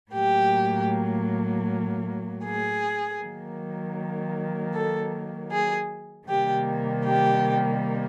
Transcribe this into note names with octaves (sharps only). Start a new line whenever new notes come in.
A2 F#3 A#3 G4
G#4
D#3 F#3 A#3
A4
G#4
C3 D#3 G3 A#3 G4
G4